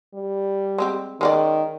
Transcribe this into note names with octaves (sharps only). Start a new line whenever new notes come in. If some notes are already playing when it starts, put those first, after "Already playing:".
G3
G#3 C4 G4
D#3 G#3 C#4 D5